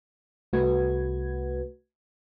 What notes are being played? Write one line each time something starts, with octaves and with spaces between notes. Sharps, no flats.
C2 A3 F#4 B4 G#6